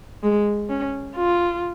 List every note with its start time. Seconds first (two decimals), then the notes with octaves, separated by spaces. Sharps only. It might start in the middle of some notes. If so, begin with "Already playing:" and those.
0.23 G#3
0.70 C#4
1.16 F4